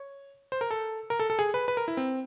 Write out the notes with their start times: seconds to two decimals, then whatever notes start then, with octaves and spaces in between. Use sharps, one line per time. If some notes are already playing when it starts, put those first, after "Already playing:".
Already playing: C#5
0.52 C5
0.61 A#4
0.71 A4
1.10 A#4
1.20 A4
1.30 A4
1.39 G#4
1.54 B4
1.68 B4
1.77 A#4
1.88 E4
1.97 C4